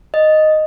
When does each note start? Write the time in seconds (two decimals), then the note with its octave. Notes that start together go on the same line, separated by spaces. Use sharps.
0.14 D#5